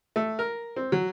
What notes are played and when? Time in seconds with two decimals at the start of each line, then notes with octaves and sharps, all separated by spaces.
0.16 A3
0.39 A#4
0.76 C4
0.92 F#3